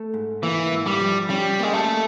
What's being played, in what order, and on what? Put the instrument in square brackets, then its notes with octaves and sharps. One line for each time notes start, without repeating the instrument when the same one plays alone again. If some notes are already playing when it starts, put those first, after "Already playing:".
Already playing: [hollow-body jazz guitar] A3
G#2
[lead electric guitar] E3 [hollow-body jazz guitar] A#3
[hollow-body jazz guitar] G#2
[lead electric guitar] G3
[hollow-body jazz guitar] F3
[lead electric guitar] G3 [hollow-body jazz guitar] C#4
[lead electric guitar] G#3 [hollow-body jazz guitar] A#3
[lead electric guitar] A3